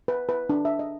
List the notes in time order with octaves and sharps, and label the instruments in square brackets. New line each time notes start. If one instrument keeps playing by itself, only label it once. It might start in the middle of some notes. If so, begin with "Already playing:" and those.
[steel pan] B4
B4
D4
E5
D#5